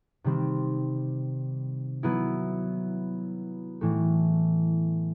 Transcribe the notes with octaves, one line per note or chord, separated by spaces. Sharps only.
C3 D#3 G3 C4
F#3 B3 E4
A2 E3 A3